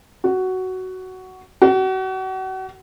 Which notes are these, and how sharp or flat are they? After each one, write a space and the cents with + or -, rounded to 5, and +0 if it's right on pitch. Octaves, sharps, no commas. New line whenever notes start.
F#4 +10
F#4 +35